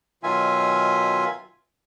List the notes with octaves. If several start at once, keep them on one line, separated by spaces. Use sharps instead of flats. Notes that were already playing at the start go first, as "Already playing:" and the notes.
B2 D#3 F#3 F4 E5 G#5